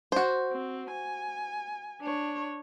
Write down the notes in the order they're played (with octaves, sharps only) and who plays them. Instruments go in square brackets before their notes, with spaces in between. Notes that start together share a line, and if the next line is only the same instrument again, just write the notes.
[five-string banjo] F#4 C5
[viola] C4
G#5
D4 C#5